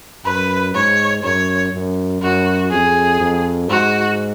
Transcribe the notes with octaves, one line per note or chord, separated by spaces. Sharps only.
F#2 B4
G#2 C#5
F#2 C#5
F#2
F#2 F#4
F2 G#4
F2
G#2 F#4